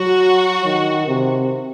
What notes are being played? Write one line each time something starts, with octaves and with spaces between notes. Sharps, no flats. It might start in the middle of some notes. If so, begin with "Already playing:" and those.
Already playing: F#3 F#4
D#3
C3